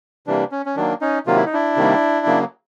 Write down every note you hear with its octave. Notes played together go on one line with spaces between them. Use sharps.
C3 E3 G3 A#3 D4
C#4
C#4
D#3 F#3 A#3 D4
C#4 D#4
C3 D#3 F#3 A#3 F4
E4
D#4
D4 E4
C3 D#3 G3 A#3
C#3 F#3 A#3